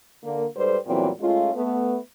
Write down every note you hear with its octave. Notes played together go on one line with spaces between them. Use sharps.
D3 A#3
G#2 G3 A4 B4 C5
E2 A#2 E3 F#3 G3 C4
G#3 A3 C#4 F4
A3 B3